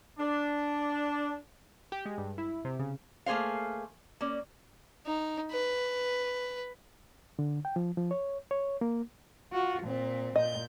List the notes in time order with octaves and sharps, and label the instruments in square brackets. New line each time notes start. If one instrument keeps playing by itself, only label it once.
[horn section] D4
[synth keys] G4
G#3
G2
E4
C3
C#3
[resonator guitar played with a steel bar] A3 A#3 G#4 C5 F5
A#3 C#4 D5
[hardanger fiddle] D#4
B4
[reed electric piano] D3
G5
F3
F3
C#5
C#5
A#3
[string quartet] F4 F#4
A#2 C4
[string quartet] A#2 G6 [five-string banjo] D#5